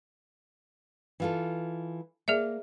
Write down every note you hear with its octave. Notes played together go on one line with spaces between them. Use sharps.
E3 F4 A4
A#3 G#4 D5 E5